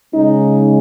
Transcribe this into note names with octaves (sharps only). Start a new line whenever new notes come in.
C#3 G#3 C#4 D#4